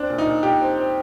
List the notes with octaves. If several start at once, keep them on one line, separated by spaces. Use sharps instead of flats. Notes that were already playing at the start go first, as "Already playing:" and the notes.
Already playing: C4 D4
A#2
D#4
A#2
A#2 G4
C4
C4